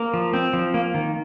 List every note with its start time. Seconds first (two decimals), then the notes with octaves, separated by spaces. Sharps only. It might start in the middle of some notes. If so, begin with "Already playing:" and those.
Already playing: A#3
0.14 F3
0.34 C4
0.53 F3
0.74 A#3
0.94 D#3